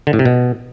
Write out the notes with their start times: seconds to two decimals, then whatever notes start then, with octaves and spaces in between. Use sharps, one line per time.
0.07 D3
0.13 A2
0.19 C3
0.25 B2